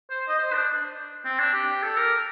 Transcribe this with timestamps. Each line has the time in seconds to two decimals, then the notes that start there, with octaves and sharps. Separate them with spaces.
0.10 C5
0.28 D#5
0.39 C5
0.53 D4
1.25 C4
1.40 D4
1.54 G4
1.82 A4
1.97 A#4